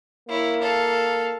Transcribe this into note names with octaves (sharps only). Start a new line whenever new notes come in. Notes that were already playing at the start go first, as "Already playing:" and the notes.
A#3 E4 C#5
A4 F5